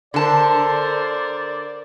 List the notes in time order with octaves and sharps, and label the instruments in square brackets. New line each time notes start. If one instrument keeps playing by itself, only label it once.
[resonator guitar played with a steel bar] D3 A5 [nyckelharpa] A#4 C5 [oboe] D5